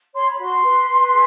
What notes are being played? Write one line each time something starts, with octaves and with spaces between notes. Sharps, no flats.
C#5 C6
B5
F#4 C6
B4
B4
G#4